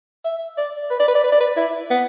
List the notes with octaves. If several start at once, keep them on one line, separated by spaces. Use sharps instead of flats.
E5
D5
B4
D5
B4
D5
B4
D5
B4
E4
B3